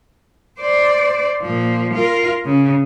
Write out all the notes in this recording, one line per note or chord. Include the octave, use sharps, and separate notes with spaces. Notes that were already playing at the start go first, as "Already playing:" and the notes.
C5 D5
A#2 F3
F4 A#4
C#3